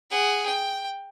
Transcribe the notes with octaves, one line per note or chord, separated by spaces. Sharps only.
G#4 F#5
G5